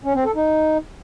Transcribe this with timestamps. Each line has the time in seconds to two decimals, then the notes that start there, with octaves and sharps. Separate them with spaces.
0.04 C#4
0.14 C4
0.25 A4
0.35 D#4